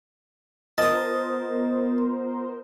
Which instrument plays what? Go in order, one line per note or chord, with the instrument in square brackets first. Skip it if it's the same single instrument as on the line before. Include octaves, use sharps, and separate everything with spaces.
[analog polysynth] B3 A#4 C5 [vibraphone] F4 [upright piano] D#5 [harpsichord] A5 D#6